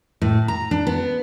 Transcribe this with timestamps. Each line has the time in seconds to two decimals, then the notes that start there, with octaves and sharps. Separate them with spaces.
0.22 A2
0.48 A#5
0.71 D4
0.87 B3